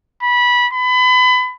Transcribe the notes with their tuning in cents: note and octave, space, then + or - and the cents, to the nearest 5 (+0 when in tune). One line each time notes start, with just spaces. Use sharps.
B5 -20
B5 +30